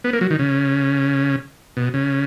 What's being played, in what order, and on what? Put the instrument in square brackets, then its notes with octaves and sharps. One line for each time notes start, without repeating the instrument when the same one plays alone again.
[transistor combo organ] B3
A#3
F#3
D#3
C#3
B2
C#3